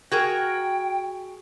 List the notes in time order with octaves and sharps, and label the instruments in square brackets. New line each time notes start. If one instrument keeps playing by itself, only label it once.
[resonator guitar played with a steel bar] F#4 G#4 A#4 [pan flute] G5